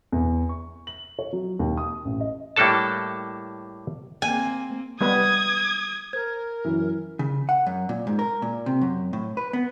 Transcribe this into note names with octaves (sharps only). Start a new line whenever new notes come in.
E2
C#6
F#7
C#5
F#3
D#2
D#6
A1
D#5
A2 G3 A#3 D4 A4 A5
A#3 C4 G#5
G3 B3 B4 D#6 G#6
A#4 C5 G#6
F#2 E3
C#3
F#5
F#2
A#2
G#2
A#4
A#2
C3
F#2
A2
B4
B3